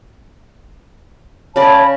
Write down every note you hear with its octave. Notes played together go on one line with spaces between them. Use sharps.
C#3 C#5 D5 A5 B5